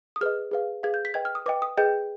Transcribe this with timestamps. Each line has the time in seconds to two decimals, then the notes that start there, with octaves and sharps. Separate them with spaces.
0.16 D#6
0.21 G#4 B4 D#5 F6
0.51 G#4 B4 F5
0.83 G#4 B4 F5 G#6
0.94 G6
1.05 B6
1.14 B4 D#5 G5 G#6
1.25 F6
1.35 D#6
1.46 B4 D#5 G5 D6
1.62 D#6
1.77 G#4 B4 D#5 G5 G6